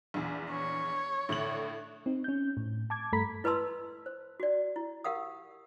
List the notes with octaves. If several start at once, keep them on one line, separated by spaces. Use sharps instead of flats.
A#1 E2
C#5
A2 D3 F#7
C4 D#4
C#4 G6
A2
A5 D6 G#6
G2 A3 A4 A#5 B5 B6
E4 B4 D#5 A5 C6 E6
C5
F#4 D5
E4
G4 A#4 F5 F#5 D#6